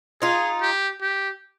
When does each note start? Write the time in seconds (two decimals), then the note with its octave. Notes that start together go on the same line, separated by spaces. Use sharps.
0.22 D#4 F4 G#4
0.61 G4
1.01 G4